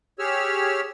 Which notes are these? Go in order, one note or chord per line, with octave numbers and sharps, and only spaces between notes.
G4 G#4 C#5 E6 F6